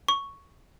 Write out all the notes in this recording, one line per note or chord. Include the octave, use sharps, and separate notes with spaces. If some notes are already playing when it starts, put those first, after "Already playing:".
C#6